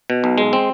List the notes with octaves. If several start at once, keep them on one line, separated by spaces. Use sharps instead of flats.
B2
B1
G#3
C4